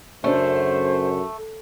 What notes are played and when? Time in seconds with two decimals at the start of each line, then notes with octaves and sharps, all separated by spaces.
0.24 F#2 C#3 A3 C#4 D4 C5